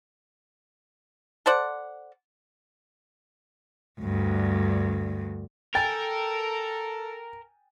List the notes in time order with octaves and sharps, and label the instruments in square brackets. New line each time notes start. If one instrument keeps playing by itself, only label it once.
[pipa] A4 C5 D5 F#5
[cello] D2 G2
[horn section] A4 [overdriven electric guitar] A#4 [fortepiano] G5 G#5 [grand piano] A6